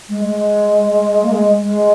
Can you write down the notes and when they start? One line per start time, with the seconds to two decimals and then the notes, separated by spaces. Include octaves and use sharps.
0.09 G#3
0.25 G#3
1.24 A#3
1.32 G#3
1.62 G#3